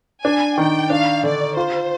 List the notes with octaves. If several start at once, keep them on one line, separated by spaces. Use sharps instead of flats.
D4 G#5
D#3 G5
D4 F5
D3 D5
F4 C5